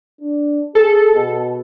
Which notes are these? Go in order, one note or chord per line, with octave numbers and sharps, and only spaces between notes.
D4
G#4 A4
B2